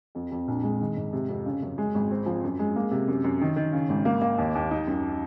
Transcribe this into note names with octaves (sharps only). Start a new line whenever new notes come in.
F2
F2
A#1
G#3
D#3
G#2
C3
F2
C#3
F#2
G#3
G#1
C4
F3
F#2
G#3
A#3
C3
F#2
F#2
D#3
D#3
C#3
G#1
A#3
A#3
D#2
D#2
D#4
F#2